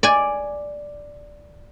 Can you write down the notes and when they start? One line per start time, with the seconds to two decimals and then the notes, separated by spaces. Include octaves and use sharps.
0.03 D5 G#5